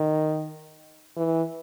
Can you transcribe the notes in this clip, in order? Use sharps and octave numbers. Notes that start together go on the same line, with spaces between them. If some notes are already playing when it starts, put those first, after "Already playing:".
Already playing: D#3
E3